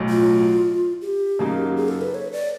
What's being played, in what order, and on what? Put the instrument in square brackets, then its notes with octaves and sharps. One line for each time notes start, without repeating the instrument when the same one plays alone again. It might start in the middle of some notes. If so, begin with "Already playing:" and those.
Already playing: [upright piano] B1 A2 F#3
[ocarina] F4
G4
[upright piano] F#2 C#3 F#3 A#3 D#4
[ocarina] G#4
A4
B4
C#5
D5